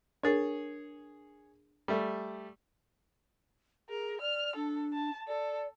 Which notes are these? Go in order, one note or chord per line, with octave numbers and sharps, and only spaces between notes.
D4 G#4 A#4 C#5 A6
G3 A3
G#4 A#4
D5 F6
D4 A4
A5
A4 D5